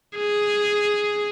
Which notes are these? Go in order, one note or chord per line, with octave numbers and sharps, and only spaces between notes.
G#4